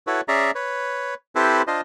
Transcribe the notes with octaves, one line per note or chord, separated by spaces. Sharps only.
E4 F#4 A4 B4 C#5
C#4 G#4 D5 E5 A#5
B4 C#5
C4 E4 G4 A4 B4 C5
D4 F4 C5 D#5